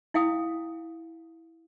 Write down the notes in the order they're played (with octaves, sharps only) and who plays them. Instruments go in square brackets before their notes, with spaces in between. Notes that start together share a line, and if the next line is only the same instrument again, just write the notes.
[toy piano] E4 F5 G5 D#6